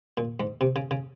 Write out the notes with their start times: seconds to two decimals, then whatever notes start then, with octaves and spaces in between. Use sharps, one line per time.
0.17 A#2
0.40 G#2
0.61 C3
0.76 C#3
0.91 C#3